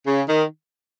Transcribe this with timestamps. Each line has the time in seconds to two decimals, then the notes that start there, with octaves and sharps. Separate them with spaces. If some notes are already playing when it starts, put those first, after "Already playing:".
0.06 C#3
0.28 D#3